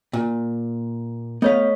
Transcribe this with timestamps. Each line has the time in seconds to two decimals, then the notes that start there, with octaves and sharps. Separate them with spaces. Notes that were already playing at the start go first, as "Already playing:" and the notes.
0.13 A#2
1.42 A3 B3 C#5 F5 B6